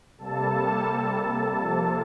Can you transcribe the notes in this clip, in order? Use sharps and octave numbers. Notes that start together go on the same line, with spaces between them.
C3 G3 A#3 A4 A5
C3 F3 A#3